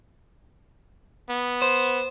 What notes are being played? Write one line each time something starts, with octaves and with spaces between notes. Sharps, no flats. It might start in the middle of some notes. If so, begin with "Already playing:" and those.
B3
C5